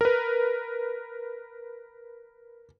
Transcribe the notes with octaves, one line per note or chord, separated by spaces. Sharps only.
A#4 B4